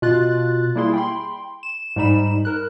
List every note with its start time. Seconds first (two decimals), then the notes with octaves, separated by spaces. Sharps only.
0.02 B2 F4 F#6 A6
0.75 G3 A#3 E4 G#4 C6
0.94 G5 B5 C6
1.63 E7
1.96 G#2 G3 D#4 B5 E7
2.45 A#4 F#6